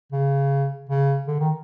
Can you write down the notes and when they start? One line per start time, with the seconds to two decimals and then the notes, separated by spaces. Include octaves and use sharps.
0.12 C#3
0.89 C#3
1.27 D3
1.40 D#3